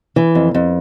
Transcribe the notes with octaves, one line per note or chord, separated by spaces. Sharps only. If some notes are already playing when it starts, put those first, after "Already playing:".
E3
F2
F2